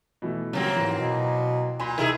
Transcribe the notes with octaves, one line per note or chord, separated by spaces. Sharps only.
B2 E3 A3
C#3 F#3 G3 A#3 C4
G#2 E3
B2
A#2 G#5 B5 C6
C3 D#4 E4 G#4 A#4